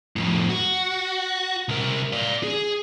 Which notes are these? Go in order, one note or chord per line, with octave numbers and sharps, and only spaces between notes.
F2 A2
F#4
C2 A#4
D5 F5
G#4